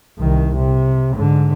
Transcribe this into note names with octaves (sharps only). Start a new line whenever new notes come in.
C2 D#3
C3
G#2 D3